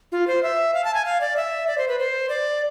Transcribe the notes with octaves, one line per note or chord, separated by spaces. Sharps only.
F4
C5
E5
F5
A5
G#5
F5
D5
E5
D5
C5
B4
C5
D5